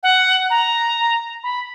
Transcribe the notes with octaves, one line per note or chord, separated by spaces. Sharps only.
F#5
A#5
B5